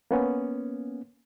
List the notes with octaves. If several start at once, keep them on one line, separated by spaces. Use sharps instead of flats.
A#3 B3 C#4